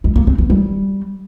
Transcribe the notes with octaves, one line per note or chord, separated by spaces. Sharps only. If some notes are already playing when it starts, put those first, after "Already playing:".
G#3
A#3
C4
B3
G3